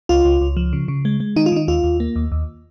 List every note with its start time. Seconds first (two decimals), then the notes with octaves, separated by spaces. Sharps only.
0.09 C#2 F4
0.25 C#2
0.41 C#2
0.57 F3
0.73 C#3
0.88 C#3
1.05 G#3
1.20 G#3
1.36 D#3 D#4
1.46 F4
1.52 D#3 D#4
1.68 D#2 F4
1.84 D#2
2.00 A#3
2.16 D#2
2.32 D#2